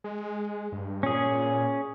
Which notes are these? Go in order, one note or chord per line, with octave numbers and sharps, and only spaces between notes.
G#3
G2
A#2 C#4 G#4